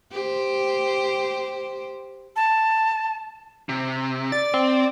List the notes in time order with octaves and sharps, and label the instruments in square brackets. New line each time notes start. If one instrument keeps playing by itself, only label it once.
[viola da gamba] G4 C5
[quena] A5
[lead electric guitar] C3
[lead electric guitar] D5 [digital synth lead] A6
[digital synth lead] C4